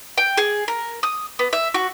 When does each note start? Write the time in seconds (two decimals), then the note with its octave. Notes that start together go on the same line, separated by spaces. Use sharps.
0.17 G5
0.37 G#4
0.68 A#4
1.03 D#6
1.39 B3
1.53 E5
1.74 F#4